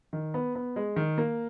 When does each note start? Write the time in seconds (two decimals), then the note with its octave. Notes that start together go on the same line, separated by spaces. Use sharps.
0.13 D#3
0.34 B3
0.55 B3
0.76 G#3
0.96 D#3
1.18 A#3